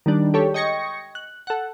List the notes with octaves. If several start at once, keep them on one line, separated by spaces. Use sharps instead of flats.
D#3 G3 D4
G#3 G4 A4 C#5
D#5 G5 C#6 G#6 A#6 C#7
F#6
A4 F#5